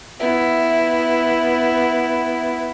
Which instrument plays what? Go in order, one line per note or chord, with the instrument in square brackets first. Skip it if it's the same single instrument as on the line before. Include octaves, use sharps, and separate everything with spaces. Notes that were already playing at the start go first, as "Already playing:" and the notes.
[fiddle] B3 E4